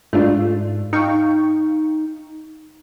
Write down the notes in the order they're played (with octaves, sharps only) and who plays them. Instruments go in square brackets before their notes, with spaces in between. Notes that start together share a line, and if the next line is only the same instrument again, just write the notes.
[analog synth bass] G#2 [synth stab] A3 D4 F4
[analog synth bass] D#4 [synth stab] F5 G5 C#6